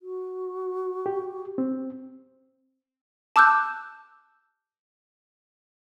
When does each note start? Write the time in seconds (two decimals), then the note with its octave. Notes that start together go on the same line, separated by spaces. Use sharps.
0.01 F#4
1.06 G4
1.58 C4
3.36 A5 D6 E6 F#6 G6